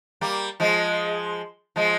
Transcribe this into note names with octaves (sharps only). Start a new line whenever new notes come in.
G3 A#3
F3 G#3
F3 G#3